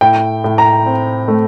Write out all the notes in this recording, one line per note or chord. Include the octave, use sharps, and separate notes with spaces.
A2 G5
A2
A#5
C4
A3